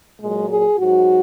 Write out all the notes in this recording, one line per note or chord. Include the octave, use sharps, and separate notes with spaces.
A#2 F#3 G#3
G#4
G#2 F#3 F#4